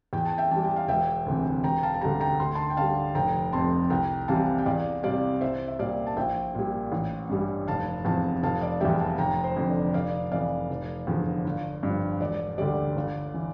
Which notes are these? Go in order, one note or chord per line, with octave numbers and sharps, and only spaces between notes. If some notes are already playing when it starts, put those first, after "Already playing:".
E2 G5
A5
E5 G5
E3 G3 A5
G5
F5
E1 E5 G5
D2 C3 E3
E1 G5 A#5
F5 A5
A5
D2 D3 G3 G5 A#5
G5 A#5
D2 C6
A5 C6
G5
D3 G3 F5 A5
F1 G5 A#5
F2 C3 A5 C6
C2 G5 A#5
C3 E3 G3 F5 A5
G5
E2 D5 F5
C3 G3 D5 F5
C2 C5 E5
E5
A#2 G3 D5 F5
A5
A#1 E5 G5
A#2 G3
A1
G2 E3 G3
F1 F5 A5
E2 C3 F3 F5 A5
F1 F5 A5
D5 F5
E2 E3 G3 E5 G5
F5 A5
F1 G5 A#5
C5
F2 D3 F3
D5
F1 D5 F5
F2 E3 D5 F5
F1
E2 D3 F3
G1
G2 F3
E1 D5
D2 D3 G3 D5
G1
E3